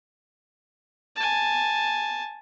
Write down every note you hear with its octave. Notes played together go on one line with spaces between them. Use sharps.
G#5 A5